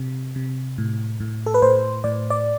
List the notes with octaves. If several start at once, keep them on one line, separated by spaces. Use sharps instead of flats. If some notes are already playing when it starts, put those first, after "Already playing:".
Already playing: C3
C3
A2
A2
A4
B4
A2 C5
A2 D5
D5